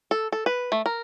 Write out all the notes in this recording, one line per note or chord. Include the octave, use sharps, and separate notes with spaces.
A4
A4
B4
A3
A#4